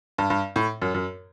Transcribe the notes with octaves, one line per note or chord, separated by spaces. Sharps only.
G2
G2
A2
F#2
F#2